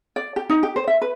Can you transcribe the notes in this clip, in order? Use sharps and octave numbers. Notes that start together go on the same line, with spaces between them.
D5
G4
D#4
G4
C5
E5
B4